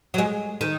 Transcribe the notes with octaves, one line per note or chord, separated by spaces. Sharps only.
F#3
G#3
D#3